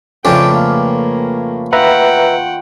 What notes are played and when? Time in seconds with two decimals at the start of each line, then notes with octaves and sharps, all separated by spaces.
0.25 F2 C#3 A3 D4 B4 D5 G5
0.54 A#3 F5 D6
1.73 D#3 F4 B4 E5 F#5 G5 A#5